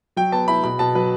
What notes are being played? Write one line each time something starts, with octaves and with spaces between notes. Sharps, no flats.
F#3 G5
B3 A5
E4 B5
B2 B5
B2 A5
F#3 B4